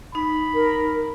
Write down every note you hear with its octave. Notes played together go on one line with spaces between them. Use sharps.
D#4 B5
A#4